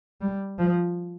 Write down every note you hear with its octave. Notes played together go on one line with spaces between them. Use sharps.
G3
F3